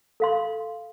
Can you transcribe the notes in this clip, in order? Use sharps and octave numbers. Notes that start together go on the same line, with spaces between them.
A4 F5 C6